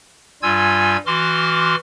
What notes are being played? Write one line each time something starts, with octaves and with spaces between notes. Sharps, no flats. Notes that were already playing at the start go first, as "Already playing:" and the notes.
G2 G3 F4 G#5 E6 G#6
E3 F#4 C6 D6 F6